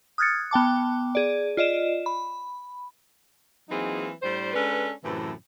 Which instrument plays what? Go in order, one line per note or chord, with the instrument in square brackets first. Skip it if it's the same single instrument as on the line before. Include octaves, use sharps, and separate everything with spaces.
[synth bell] D#6 F6 F#6 G#6 A6 C#7
B3 G5 A5 D6
G#4 D5
F4 D5 D#5 E7
B5
[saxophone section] E3 F#3 A#3 C4 D#4 G#4
A2 G3 D4 C5
G#3 C#4 D4 A4 B4
F#2 A2 C3 E3